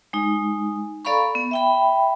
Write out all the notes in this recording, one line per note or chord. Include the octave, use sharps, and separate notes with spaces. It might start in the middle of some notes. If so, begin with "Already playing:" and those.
G#3 D#4
A4 D5 F5 A#5 B5 C#6
B3
E5 G5 B5